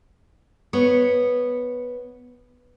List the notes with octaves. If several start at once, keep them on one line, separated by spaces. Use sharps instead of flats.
B3 C#5